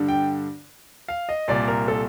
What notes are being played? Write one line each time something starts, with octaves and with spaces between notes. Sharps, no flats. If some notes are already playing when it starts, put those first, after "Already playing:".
Already playing: G2 D3
G5
F5
D#5
C2 A#2 D5
A#4
A4